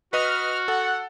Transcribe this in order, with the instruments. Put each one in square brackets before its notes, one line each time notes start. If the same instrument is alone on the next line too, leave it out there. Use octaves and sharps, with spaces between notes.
[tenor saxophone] F#4 [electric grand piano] B4 D#5 D#6 [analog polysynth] F6
[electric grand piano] A4 [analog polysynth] F#5